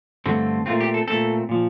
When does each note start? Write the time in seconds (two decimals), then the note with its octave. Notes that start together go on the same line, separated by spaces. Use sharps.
0.26 G2 D3 A3 C4
0.66 A#2 A3 C4 F4
0.81 G4
0.94 A4
1.07 A#2 A3 C4 A4
1.49 A#2 F3